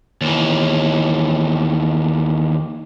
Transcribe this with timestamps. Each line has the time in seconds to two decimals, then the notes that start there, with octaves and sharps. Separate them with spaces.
0.21 D#2 E3